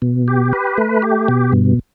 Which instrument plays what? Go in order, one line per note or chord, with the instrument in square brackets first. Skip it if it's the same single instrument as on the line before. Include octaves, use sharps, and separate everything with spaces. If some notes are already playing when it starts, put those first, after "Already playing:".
[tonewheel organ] B2
G4
B4
A3
G4
B2
G2